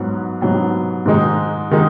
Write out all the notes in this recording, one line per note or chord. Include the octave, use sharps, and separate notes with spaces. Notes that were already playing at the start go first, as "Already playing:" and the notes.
Already playing: G#2 F#3 B3
G#2 F#3 B3
G#2 D#3 G#3 D#4
D#3 G#3 D#4